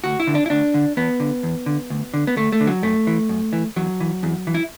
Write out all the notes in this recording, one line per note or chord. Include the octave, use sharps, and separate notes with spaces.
D2 F#4
E4
D3
D4
E4
D2 D4
D3
E2 B3
D3
E2
D3
D2
D3
B3
D2 A3
A3
D3
F#3
F#2 A3
E3
F#2
E3
E2 F#3
E3
E2
E3
E4